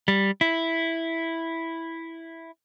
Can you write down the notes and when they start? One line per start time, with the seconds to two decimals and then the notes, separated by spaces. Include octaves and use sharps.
0.08 G3
0.41 E4